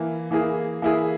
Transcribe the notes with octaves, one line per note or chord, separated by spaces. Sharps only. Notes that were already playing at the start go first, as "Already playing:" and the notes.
Already playing: E3 A#3 E4
E3 A#3 E4 G#4
E3 A#3 E4 G#4